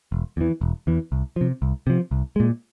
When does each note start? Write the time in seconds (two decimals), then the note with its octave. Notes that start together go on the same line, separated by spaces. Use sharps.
0.12 E1
0.37 E2 E3
0.61 E1
0.87 E2 E3
1.12 C2
1.36 C3 F3
1.62 C2
1.87 C3 F3
2.11 C2
2.36 A#2 G#3